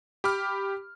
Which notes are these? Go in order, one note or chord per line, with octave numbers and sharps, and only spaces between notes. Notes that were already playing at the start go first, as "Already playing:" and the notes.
G4 B5 D6 F6